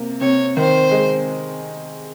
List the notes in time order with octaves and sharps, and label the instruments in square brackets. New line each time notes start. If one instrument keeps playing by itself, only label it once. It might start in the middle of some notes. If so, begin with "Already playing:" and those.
Already playing: [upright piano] C3 A#3
[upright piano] C3 [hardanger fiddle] C#5
[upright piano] D#3 [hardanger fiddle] C5
[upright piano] G#3